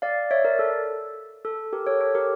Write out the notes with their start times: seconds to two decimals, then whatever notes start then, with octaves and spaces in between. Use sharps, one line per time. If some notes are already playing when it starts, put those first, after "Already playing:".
0.02 D5 F5
0.31 C#5 E5
0.44 A#4 D5
0.59 A4
1.45 A4
1.73 G4 A#4
1.86 A4 C#5
2.01 A4 C#5
2.15 G4 A#4